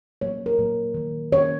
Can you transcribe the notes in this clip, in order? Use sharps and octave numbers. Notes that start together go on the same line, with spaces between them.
A#2 F#3 A#3 C#5
A#4
A#2 F#3 A#3
D#3 A#3
D#3 A#3 C#5